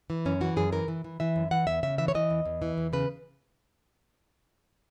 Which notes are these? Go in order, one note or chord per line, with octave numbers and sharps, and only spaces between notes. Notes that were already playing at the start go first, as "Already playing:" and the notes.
E3
F#2 C#4
E3 F#4
F#2 G#4
E3 A#4
E3
E3
E3 E5
F#2
E3 F#5
E2 E5
C#3 E5
E3 E5
C#5
E3 D#5
E2
E2
E3
E2
C#3 B4